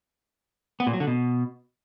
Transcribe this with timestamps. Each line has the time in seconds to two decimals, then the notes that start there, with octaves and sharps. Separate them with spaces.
0.80 B3
0.87 A#2
0.94 F#3
1.00 D3
1.07 B2